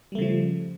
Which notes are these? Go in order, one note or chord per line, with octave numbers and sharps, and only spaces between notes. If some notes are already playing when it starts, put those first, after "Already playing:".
C#3 F3 G3 A3